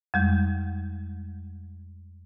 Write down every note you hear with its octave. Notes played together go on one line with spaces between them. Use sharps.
F2 G3 G#3